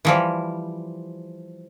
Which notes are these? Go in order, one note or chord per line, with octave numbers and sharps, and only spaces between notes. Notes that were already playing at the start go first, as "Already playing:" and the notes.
E3 F3 G3